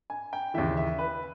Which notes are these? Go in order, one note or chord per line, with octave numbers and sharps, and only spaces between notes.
G#5
G5
D#2 C#3 E3 E5
E5
B4